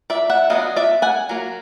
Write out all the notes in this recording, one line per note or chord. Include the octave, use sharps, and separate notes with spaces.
D5 E5
E5 F#5
F#3 B3 D4 D#5 F5
D5 E5
F#5 G#5
F#3 A#3